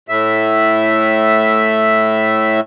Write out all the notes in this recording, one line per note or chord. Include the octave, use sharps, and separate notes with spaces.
A2 E5